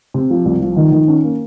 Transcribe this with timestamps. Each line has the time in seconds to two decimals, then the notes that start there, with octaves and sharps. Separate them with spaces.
0.14 C3
0.30 F3
0.45 C2
0.61 F3
0.76 D#3
0.92 D#3
1.08 C#4
1.24 A#3